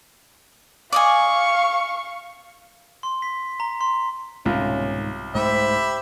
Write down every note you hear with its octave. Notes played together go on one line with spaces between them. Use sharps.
D5 D#5 F5 G#5 C#6
C6
B6
A#5
C6
C2 G#2 B2 D#3 C#4 F4
G#2 A3 G4 C5 E5 B5